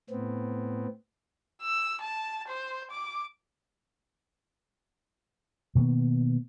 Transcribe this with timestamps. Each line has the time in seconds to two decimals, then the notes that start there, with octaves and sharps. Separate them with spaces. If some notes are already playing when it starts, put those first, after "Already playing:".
0.10 A2 B3 C4
1.62 E6
2.01 A5
2.48 C5
2.90 D6
5.75 B2 D#3 A#3 B3